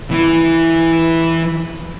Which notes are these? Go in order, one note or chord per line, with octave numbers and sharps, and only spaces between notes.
E3 E4